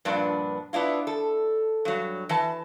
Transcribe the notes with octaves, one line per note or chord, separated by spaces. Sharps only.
G2 A#2 F3 B3 D4
B3 D4 E4 F4
A4
G2 F#3
E3 A5